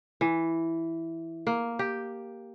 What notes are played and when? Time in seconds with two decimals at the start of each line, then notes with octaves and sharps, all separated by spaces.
0.21 E3
1.47 A#3
1.79 G4